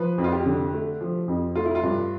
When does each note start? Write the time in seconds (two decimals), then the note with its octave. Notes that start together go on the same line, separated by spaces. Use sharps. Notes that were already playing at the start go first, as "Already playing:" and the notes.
Already playing: F3 B4
0.18 F2
0.24 F4
0.32 G4
0.46 D3
0.73 A3
1.01 F3
1.28 F2
1.55 A3 F4
1.65 E4
1.75 F4
1.83 G2